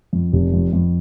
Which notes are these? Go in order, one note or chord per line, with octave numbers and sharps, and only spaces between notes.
F2
F1
F2
F2